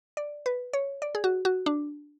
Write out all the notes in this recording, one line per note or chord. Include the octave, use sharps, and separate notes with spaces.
D5
B4
C#5
D5
G#4
F#4
F#4
D4